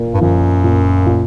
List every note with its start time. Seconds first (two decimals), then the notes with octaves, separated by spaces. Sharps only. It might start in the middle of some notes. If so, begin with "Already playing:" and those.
Already playing: A#2 A#3
0.14 G2
0.21 F#2 F3
0.64 A#2
1.06 A#2